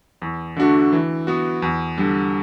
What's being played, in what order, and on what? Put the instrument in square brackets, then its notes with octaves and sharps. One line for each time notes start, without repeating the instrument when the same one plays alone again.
[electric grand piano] E2
D3 A3 D4 F#4
E3
B3 F#4
E2
D3 G3